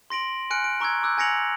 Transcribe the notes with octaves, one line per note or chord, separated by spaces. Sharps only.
C6 A#6 D7 F#7
G#5 F6 F#6 C#7 D7
D7
A#5 C#6 E6 F#6 G#6
D6 E6 F#6 G6
G#5 G#6 A#6 C#7 F7 F#7